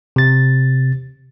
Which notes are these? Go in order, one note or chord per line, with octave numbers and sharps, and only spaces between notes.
C3 A6